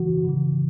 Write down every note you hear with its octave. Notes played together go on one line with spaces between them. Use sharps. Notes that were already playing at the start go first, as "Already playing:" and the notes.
Already playing: C#3 E3 F#4
C#3
E3